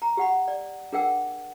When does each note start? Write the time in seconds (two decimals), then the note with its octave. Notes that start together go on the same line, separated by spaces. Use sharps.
0.02 A#5
0.17 G4 F#5 B5
0.48 D5
0.92 D4 G#4 A#4 F#5 G5 E6